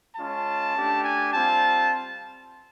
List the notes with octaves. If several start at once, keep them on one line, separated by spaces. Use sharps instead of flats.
G#3 C#4 F4 A5
A3 D4 G4
G#5
G3 C4 F4 A5